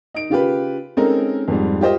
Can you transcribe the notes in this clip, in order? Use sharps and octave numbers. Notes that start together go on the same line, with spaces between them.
D#4 D7
C#3 F4 G4 B4
G#3 C4 C#4 D#4 A4 A#4
F2 G#2 G3
F4 G4 C5 D#5